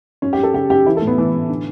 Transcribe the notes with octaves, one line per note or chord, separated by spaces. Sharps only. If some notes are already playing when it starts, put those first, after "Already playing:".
F#2 C#4
G4
F#2
A4
C#3 G4
F#2 G4
E3 E4
A4
A2
B3
A2 E3
A2
D3